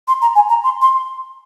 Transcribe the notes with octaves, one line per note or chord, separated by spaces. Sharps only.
C6
A#5
G#5
A#5
C6
C6